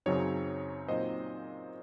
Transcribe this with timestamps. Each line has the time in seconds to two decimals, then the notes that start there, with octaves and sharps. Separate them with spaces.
0.06 F#2 C#3 F#3 C4 D#4 C#5
0.88 A#2 F#3 C4 D#4 C5 D#5